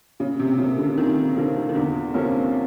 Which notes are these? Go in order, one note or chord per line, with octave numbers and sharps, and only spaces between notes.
A#2 C#3
C3
C#3 F3 A#3
D3
A#2 D#3
D3 F3 A#3
D#3
E2 D3
C3 F3 A#3 C#4